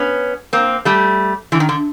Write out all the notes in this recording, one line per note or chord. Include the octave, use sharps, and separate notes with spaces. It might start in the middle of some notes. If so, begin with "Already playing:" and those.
Already playing: B3 C#4
A#3 C4
G3 A3
D3 E3
D#3
D3